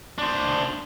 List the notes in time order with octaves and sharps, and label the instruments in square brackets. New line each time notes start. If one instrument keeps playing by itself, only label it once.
[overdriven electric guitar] D4 C5